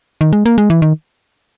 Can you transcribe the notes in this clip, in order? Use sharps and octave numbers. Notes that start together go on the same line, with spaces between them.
D#3
G#3
A#3
G#3
E3
D#3